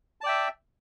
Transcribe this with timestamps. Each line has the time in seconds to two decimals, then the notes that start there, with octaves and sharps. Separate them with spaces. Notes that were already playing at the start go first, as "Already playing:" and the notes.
0.21 A5
0.24 D5
0.26 G5
0.29 E5